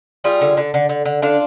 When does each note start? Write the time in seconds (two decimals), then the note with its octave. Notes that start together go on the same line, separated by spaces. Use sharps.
0.24 G3 F4 G#4
0.41 D3
0.57 D3
0.74 D3
0.89 D3
1.05 D3
1.22 D3 D4 F4